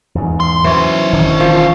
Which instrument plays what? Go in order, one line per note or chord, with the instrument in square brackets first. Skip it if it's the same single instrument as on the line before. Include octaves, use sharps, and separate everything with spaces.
[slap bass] E2 G#2
[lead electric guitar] C6
[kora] E3 [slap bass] F#3 [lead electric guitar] C#4 C5
[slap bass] E1 D#3 D4
[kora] F3